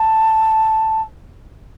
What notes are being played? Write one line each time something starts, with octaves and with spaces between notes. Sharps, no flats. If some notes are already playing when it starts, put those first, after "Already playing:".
Already playing: A5